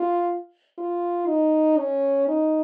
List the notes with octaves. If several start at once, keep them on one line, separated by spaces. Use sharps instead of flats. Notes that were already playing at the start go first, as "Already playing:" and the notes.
Already playing: F4
F4
D#4
C#4
D#4